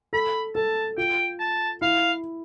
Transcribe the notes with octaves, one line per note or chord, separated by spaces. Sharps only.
A4 B5
A4 A5
F4 G5
A5
E4 F5